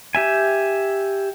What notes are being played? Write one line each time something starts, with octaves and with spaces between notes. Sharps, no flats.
G4 E5 G#5